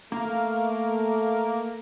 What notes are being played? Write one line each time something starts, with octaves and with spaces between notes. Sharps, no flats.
A3 A#3